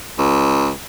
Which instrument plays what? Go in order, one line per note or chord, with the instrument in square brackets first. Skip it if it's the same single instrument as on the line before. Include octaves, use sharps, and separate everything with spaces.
[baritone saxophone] C#2